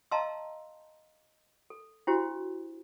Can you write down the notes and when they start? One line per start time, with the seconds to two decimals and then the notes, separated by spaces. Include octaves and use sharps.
0.11 D#5 F5 A5 A#5 C6 E6
1.70 A4
2.07 D4 E4 F#4 G4 C5